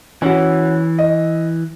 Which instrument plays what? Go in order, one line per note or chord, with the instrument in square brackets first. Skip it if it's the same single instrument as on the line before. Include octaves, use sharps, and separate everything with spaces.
[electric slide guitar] E3 [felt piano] C#4 F#4
[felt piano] D#5